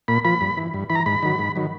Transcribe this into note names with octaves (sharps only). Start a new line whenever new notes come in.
A#2 B5
F3 B5
G2
E3
G2
E3 B5
A#5
G#2 B5
D#3 F#3
G#2
D#3 F#3